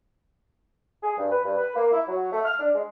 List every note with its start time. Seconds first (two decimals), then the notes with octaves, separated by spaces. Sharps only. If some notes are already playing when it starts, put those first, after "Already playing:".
1.03 G#4
1.18 G2
1.31 B4
1.45 G2
1.58 B4
1.76 A#3
1.92 E4
2.08 F#3
2.32 A3
2.45 F6
2.60 D4
2.75 G#3